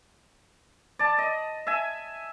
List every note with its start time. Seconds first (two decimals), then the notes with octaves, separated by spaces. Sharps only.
0.99 D5 A5
1.18 D#5
1.67 E5 G#5